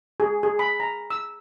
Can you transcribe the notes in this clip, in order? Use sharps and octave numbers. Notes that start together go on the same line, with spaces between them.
G#4
G#4
B5
A#5
E6